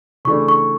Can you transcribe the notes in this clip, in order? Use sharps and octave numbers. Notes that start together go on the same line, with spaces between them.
C#3 E3 A3 D4 C#6
C#6